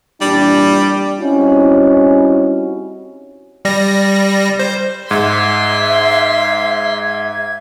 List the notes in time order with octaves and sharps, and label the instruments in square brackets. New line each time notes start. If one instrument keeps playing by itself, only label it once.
[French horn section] A#2 E3 D4 [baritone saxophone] G3
[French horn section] G3 C4 C#4 D#4 E4 F#4
[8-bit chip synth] G3 A#6
C5
[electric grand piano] G#2 [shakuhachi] E5 [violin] C6 B6 [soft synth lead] G#6